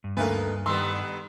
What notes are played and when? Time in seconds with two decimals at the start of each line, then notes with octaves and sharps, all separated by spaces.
0.04 G2
0.17 D2 A3 A#3 D#4 B4
0.66 D#3 G3 B3 C6 E6